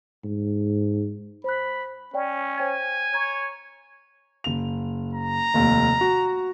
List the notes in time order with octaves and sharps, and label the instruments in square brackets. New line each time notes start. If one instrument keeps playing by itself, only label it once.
[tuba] G#2
[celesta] C5 F#6 [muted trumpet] B5
[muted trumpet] C#4 [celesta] C#5 D5 G5
[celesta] C5 C#5 G5 [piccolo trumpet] G#5
[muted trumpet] C#5 [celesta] A#5 G#6
[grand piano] F#1 F7
[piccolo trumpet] A#5
[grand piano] F1 D#2
F#4